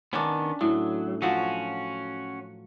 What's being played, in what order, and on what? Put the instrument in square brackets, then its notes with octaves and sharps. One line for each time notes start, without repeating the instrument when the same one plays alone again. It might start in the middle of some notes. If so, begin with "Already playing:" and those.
[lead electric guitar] D#3 B3 [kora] C#4 D4
[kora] A2 [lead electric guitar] F#3
[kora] F3 F#3 [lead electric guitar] C#4 F#4